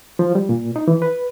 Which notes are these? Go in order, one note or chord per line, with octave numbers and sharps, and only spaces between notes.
F3
G3
A#2
D#4
E3
B4